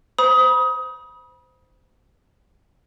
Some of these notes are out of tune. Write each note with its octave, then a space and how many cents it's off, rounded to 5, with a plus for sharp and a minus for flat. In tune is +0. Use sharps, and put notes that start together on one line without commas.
C5 -20 B5 -30 D#6 +20